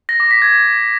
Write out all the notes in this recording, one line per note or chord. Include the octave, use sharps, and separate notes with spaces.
A#6
D6
B6
G#6